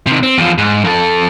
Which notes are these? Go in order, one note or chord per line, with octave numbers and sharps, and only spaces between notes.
C3 D#3
C4
E2 F3
G#2
F2 A4